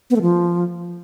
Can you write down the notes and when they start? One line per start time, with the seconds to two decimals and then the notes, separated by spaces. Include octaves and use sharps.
0.10 B3
0.16 A3
0.21 F3